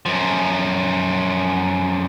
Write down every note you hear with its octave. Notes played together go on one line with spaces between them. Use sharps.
F#2 F3